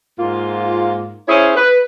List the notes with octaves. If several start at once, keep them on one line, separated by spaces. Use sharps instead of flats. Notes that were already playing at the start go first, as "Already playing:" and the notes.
G#2 A#3 F4
C#4 E4 G#4 C5 C#5
B4